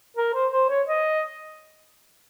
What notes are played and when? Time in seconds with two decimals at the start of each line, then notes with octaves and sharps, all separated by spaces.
0.17 A#4
0.34 C5
0.52 C5
0.69 C#5
0.87 D#5